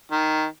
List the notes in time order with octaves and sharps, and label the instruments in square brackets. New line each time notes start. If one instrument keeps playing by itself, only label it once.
[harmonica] D#3